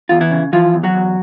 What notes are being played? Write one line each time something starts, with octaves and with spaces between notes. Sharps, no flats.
E2 F4
E3 E4
C#3
E3 F3 F4
E2
F#3 F#4
E2